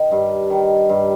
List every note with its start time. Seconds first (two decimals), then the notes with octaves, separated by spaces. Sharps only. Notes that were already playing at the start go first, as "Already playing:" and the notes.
Already playing: D#3
0.11 G2
0.50 D#3
0.89 G2